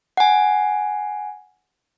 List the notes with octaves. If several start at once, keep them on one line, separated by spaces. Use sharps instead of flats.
F#5 G#5